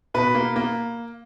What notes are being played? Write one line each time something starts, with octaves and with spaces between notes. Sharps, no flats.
B2 B4
A#3
A#3